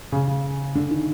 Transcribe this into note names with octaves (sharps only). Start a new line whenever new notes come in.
C#3
C#3
D3
D#3